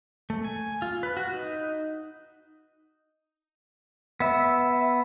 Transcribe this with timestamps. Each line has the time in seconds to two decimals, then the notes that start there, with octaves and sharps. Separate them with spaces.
0.30 A3
0.44 G#5
0.82 F4
1.03 B4
1.17 F#4
1.34 D#4
4.20 B3 E5